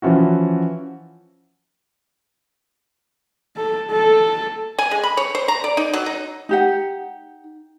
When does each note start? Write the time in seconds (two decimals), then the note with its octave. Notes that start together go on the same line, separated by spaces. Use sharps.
0.02 E3 F3 C#4 E4 F#4
3.56 A4
3.90 A4
4.78 G#5
4.91 G#3
5.03 B5
5.17 C#5
5.35 C5
5.48 A#5
5.64 D5
5.77 D#4
5.93 F#3
6.06 D#4
6.49 D#4 G4 F#5